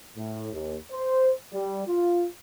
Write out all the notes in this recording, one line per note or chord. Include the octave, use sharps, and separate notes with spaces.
A2
D#2
C5
G3
F4